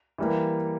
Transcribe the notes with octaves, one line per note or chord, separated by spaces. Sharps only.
E3 G3 A#3